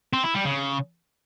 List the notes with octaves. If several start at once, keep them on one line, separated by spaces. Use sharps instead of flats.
C4
E4
G3
C#3